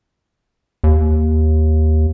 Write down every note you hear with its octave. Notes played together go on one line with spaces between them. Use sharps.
D#2